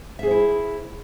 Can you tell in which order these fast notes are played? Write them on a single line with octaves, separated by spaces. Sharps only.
E5 G#4 C5 E4